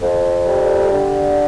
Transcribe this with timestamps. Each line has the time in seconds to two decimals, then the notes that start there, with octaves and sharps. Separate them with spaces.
0.01 F2
0.47 G3
0.91 D3